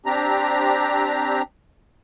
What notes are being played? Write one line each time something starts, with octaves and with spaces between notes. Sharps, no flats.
C4 D4 G4 A#5